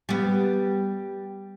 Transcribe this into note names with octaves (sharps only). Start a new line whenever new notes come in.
G3 B3